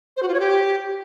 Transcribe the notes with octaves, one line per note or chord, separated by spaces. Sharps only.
C5
F#4
F4
C#5
G4